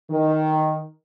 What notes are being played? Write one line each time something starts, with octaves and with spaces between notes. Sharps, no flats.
D#3